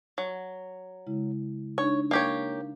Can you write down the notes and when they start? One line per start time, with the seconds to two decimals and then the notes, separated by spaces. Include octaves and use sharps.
0.18 F#3
1.07 C#3 G#3 E4
1.78 D4 D#4 C#5
2.11 A#3 G4 C#5 F5